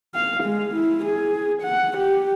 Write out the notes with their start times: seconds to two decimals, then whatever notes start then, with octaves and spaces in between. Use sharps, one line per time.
0.15 F5
0.43 G#3
0.74 E4
1.05 G#4
1.62 F#5
1.98 G4